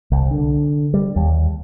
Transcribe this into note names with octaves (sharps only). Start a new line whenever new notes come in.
C2
D3
G3
D#2